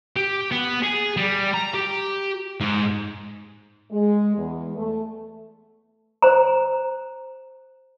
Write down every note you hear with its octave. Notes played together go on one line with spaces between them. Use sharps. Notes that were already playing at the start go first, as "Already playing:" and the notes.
G4
B3
G#4
G3
A#5
G4
G#2
G#3
E2
A3
C5 A#5